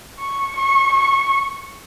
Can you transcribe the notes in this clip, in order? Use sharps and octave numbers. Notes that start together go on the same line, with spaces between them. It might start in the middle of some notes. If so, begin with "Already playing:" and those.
C#6
C#6
C#6